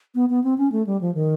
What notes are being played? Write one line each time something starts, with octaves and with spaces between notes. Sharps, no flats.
B3
B3
C4
C#4
A3
G3
F3
D#3